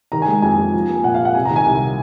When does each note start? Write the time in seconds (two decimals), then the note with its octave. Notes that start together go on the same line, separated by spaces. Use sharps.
0.12 D#3 A#5
0.22 G#5
0.28 G#3
0.42 F2 G#5
0.58 F2
0.74 F3
0.89 A#3
1.04 A#2 F#5
1.14 A#2 F5
1.25 F#5
1.34 C3 G#5
1.45 A#5
1.51 D#3
1.56 G#5
1.66 C2